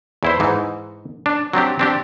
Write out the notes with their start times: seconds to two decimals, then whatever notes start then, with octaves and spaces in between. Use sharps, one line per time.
0.23 E2 E4 C5
0.40 G#2 E3 D#4
1.26 D4
1.53 F#3 C4 D4 G4
1.79 C4 D4 G4